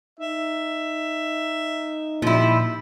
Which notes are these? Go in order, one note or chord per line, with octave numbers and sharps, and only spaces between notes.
D#4 E5
A#2 F3 G3 E4